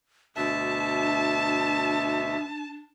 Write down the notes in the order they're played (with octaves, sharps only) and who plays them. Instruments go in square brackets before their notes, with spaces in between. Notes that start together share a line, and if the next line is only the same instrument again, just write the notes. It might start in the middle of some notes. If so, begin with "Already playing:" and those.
[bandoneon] D2 B2 E5 [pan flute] D4 [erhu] A5